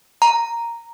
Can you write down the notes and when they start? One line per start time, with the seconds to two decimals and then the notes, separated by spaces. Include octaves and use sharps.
0.22 A#5